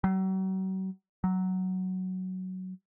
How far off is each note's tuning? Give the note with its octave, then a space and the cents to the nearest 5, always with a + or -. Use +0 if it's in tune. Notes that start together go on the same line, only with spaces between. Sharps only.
F#3 +40
F#3 +5